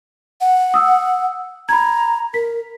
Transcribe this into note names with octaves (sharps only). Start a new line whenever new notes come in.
F#5
D#6 E6
A#5 B5 G#6
A#4 B6